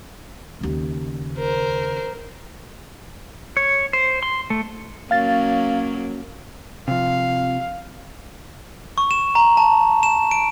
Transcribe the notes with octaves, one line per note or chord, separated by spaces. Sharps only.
D#2 C#3
A#4 C5
C#5
C5
C6
A3
F#3 A#3 C#4 F5 A6
C3 F3 F5
C#6
E7
A#5
A5
E7
D7